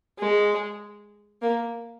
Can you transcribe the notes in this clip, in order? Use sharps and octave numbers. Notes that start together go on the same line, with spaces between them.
G#3
A#3